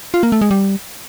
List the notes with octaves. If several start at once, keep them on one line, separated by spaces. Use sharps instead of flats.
F4
A#3
A3
G#3
G3